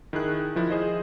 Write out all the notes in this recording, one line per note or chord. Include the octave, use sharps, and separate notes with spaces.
D#3 E4 G#4 F#6
D#3 F3 E4
G#4 C5 D#5